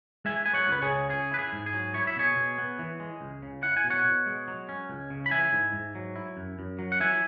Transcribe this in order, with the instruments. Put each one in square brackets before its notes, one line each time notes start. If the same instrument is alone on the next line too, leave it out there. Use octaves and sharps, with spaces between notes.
[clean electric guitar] G#3 E5 G#5
B3 G#5
C#5 F#5
C#2 B4
G#4 C#5
C#3
C#4 G#4
E4 B4
G#4
G#2
G#4
F#3
E4 C#5
E5
B2 G#4 C#5
B2
B3
E3
G#3
C#2
C#3
E4 F#5
G#5
B2
C#5 F#5
B2
G#3
F#3
C#4
C#2
C#3
B5
E4 E5 G#5
G#2
G#2
F#3
E4
F#2
F#2
F#3
F#5
E4 E5 G#5